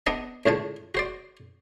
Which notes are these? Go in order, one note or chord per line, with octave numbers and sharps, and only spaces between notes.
B3 D4 D#5 F#5 A5
C#2 A2 D3 A5
F#4 C5 D5